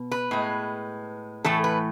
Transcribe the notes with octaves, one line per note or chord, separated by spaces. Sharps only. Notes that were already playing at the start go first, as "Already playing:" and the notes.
Already playing: B2
B4
A2 G#3
A2 E3 A3 A4
B4